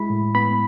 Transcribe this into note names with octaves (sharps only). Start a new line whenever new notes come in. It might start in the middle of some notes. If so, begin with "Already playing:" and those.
Already playing: G#3 E4 B5
A2
B3 B5